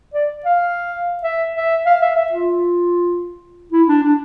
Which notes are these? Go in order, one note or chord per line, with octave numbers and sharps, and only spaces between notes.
D5
F5
E5
E5
F5
E5
E5
F4
E4
D4
D4